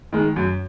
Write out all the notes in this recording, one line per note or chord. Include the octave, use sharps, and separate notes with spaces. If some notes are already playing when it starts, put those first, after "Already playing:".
D#3 G#3
F#2